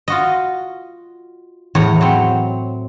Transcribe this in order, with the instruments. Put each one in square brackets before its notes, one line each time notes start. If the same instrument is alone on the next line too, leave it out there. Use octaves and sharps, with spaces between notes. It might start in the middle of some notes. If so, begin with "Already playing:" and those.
[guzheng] F4 F#4 D#5
E2 A2 C#5 A#5
F#3 C4